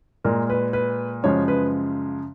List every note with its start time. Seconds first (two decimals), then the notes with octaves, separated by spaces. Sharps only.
0.24 A#2 G#3 A#4
0.50 B4
0.73 B4
1.23 F#2 C#3 F3 G#3 C#5
1.48 B4